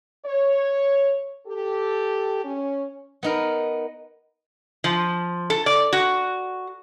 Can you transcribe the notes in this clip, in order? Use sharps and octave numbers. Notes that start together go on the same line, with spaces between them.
C#5
G4 A4
C#4
B3 D#4 A#4
F3
A4
D5
F#4